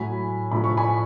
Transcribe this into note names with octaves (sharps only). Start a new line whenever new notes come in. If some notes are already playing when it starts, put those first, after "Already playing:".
Already playing: A2 F#3 G#5 B5
A2 F3 B5
C#6
G#5 B5